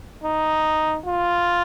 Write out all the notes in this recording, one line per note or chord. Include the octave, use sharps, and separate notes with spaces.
D#4
F4